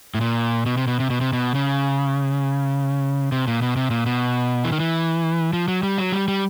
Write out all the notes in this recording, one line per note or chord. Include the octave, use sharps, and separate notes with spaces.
A2
A#2
B2
C3
B2
C3
B2
C3
B2
C#3
C3
A#2
B2
C3
A#2
B2
E3
D#3
E3
F3
F#3
G3
F#3
G3
G3